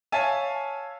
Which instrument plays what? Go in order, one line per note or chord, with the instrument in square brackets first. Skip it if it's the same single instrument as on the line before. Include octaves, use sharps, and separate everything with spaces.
[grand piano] C#5 E5 F5 G#5 A5